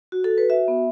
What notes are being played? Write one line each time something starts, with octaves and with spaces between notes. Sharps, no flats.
F#4
A4
F#4
B4
F#4 E5
B3